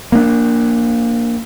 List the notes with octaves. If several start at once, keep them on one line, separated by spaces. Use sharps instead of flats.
A#3 D4